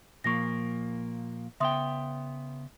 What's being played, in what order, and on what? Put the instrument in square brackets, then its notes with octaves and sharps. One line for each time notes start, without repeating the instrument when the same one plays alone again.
[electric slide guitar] A#2 F3 A#3 [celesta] C#6 A#6
[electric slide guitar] C#3 B3 G5 [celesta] E5 C6 D#6